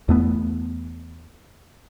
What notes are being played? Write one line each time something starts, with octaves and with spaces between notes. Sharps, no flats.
E2 A3 B3